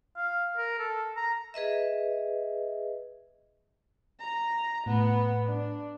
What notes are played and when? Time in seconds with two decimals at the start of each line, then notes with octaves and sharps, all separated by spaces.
0.17 F5
0.58 A#4
0.79 A4
1.17 A#5
1.54 G#4 B4 D#5 E5
4.20 A#5
4.86 A2 B3
5.46 D4